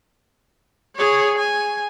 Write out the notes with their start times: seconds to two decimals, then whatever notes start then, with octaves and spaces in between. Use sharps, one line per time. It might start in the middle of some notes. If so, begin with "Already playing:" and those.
0.96 G#4 C#5
1.38 G#5